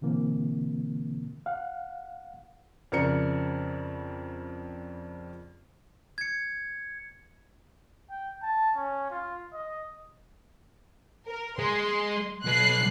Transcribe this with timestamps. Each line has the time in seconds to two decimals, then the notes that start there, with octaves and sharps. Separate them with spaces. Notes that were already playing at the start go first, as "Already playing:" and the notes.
0.01 B2 D3 E3 A#3 C4
1.46 F5 F#5
2.92 F2 C#3 A#4 D5 A#5 C#7
6.18 G#6 C#7
8.10 G5
8.42 A5
8.76 C#4
9.10 F4
9.53 D#5
11.27 A#4
11.59 G#3 C6
12.45 B1 B4 F#6 C7